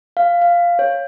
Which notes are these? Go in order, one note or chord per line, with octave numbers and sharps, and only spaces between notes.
F5
F5
C#5